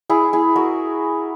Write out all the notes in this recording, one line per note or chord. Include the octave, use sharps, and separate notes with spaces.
E4 G#4
E4 G#4
F#4 A#4